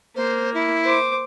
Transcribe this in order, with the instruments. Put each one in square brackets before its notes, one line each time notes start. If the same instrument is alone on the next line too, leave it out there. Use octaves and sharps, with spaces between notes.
[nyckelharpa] A#3 [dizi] C5
[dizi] E4
[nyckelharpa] C5 D6